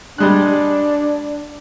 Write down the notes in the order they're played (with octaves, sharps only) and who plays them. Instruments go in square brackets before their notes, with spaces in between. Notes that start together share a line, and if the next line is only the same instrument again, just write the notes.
[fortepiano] G3 G#3 F#6 [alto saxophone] D4